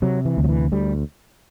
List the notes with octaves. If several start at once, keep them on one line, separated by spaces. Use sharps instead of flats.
C3 F#3
E3
D2
F#3
E3
D2 G3